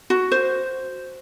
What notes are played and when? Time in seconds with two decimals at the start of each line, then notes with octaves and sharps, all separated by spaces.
0.10 F#4
0.31 C5